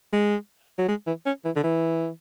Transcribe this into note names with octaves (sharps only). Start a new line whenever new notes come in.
G#3
F#3
G#3
E3
C#4
E3
D3
E3